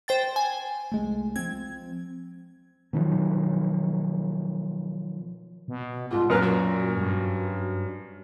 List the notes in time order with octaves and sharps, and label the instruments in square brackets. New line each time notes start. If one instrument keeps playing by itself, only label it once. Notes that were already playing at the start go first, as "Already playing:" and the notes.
[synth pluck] C5 G5 A6
G#5
[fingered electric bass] C2 G#3 A3
[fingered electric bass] F3 C4 [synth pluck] G#6
[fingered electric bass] B2 D#3 F3 F#3
[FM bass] B2
[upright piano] C2 G#2 [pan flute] F4
[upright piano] F#2 A#4 F6 [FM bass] A#2 [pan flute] B4
[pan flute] F#4
[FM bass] G2